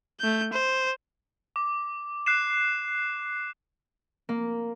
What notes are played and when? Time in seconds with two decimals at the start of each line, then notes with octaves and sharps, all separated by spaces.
0.20 A3 G6
0.53 C5
1.56 D6
2.26 F#6 C7 E7
4.29 A#3